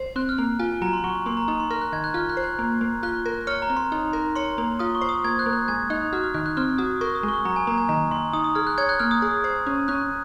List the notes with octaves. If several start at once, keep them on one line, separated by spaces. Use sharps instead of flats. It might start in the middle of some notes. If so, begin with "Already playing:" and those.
Already playing: C5
C4 F#6
F6
A#3 F#6
F4 G#5
G#5
F#3 A#5
C6
F#3 C#6
C#6
A#3 C6
A#5
D#4 A#5
C6
A#4 F6
F#6
D#3 G#6
F#6
F4 F6
F#6
C5
F#6
A#3
A#3
F4 F#6
A#4
C#5 F6
A#5
C4
C6
D#4
A#4
C#5 C6
A#3
F4 D#6
C#6
C5
D#6
A#3 G#6
F#6
A#3
F#6
G#3 G#6
D#4 F#6
F#4 F6
F6
D#3 F#6
F#6
C4 F6
F#4 D#6
A#4 C#6
D#6
G#3
C#6
F#3 A#5
G#5
A#3 A#5
G#5
D#3 A#5
D#3 C6
D#4 D#6
D#6
G#4 F6
F#6
C#5 G#6
F#6
A#3 F6
D#6
G#4
C5
C#4
C#4 F#6